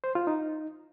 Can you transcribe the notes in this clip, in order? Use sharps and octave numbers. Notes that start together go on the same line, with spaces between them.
C5
F4
D#4